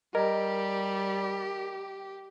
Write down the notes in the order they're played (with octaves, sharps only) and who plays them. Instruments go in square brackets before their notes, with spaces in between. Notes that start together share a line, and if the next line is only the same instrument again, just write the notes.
[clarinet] G3 [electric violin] G4 [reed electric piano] A#4 [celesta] D#5 A#5